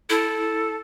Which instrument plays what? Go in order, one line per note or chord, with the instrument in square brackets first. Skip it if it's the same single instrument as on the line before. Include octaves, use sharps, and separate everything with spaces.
[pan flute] E4 [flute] A4